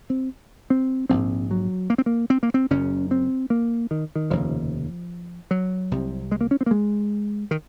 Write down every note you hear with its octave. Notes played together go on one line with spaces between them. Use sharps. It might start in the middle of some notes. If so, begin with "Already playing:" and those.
C4
C4
A#1 G#2 C4
F#3
A#3
C4
A#3
C4
A#3
C4
F#1 F#2 C#3 C#4
C4
A#3
D#3
D#3
F1 D#2 C#3 F3
F#3
C2 C3
G#3
A#3
C#4
C4
A#3
G#3
D#3